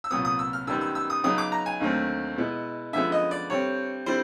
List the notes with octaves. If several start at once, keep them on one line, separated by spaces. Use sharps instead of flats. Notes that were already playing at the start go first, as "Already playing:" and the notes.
E6
C2 A#2 F#3 B3 D#6
D#6
E6
F6
F#2 D#3 G3 B3 E6
E6
E6
D#6
C#3 F#3 B3 D#4 D#6
D6
A#5
G#5
D#2 D3 F#3 A3 C4
B2 G#3 B3 E4
F#2 D3 F3 G#3 B3 E5
D#5
D5
G2 D3 G3 C4 C#5
D3 G3 C4 E4 C5